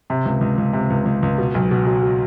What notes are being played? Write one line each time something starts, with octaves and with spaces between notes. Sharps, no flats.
C3
C#2
C#2
C#2
C3
C#2
C#2
C#2
B2
B1
B2
F#3
F#3